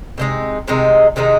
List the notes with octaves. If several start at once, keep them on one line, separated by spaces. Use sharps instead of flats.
C3 D#3 G#3 D#4
C3 D#3 G#3 D#4
C3 D#3 G#3 D#4